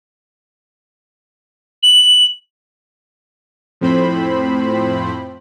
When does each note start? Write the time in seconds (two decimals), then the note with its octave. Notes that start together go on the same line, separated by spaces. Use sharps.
1.83 F#7
3.81 F2 A2 C4 C5 B5